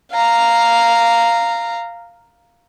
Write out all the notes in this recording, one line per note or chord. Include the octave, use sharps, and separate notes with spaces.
F5 A#5